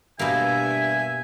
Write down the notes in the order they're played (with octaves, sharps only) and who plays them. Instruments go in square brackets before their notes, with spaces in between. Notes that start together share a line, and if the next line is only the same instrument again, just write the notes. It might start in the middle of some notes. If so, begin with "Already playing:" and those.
[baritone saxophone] G2 [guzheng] B2 A#3 [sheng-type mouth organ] E5 [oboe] G#5